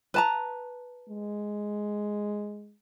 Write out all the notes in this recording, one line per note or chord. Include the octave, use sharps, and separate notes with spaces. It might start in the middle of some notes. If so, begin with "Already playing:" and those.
B4 A5 A#5
G#3